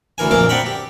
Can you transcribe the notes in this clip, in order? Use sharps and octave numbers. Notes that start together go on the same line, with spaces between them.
D2 E3 A#4 G#5
A#1 F2 E3 G#4 A#4 D6
C4 D4 F#5 G5 A#5 B5
G4